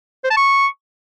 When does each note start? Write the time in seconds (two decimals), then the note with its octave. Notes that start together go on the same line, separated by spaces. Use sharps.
0.24 C5
0.30 A5
0.37 C#6